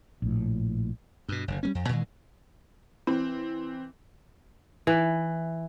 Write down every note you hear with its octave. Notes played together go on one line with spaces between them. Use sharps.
A#1 A2
G2 B2
F#1 D3
G3 A#3 C#4
F2
A#2 D#3 E3 G#3
E3 C4
E3